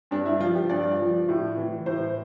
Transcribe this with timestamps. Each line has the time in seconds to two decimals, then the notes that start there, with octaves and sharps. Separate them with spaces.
0.11 G2 D4
0.25 E4
0.40 F3 F4
0.55 G4
0.69 G2 D5
0.99 F3
1.29 A2
1.57 E3
1.86 A2 C5